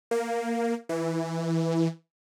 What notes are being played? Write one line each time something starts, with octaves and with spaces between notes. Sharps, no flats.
A#3
E3